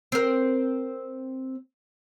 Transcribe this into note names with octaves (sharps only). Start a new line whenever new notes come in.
C4 A#4